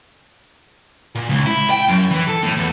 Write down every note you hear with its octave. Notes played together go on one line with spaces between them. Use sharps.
A#2
C#2
E4
G5
F#2
E3
A4
A2
E2